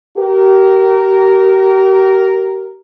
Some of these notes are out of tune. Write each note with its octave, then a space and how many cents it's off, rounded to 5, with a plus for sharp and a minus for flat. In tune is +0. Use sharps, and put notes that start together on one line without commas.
G4 -40 A#4 +0